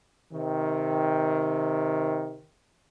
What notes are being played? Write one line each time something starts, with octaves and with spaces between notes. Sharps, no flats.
C3 D#3